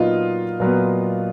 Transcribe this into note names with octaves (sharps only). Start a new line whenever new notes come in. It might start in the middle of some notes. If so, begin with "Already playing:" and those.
Already playing: A#2 F#3 B3 D#4 F4
A#2 F#3 B3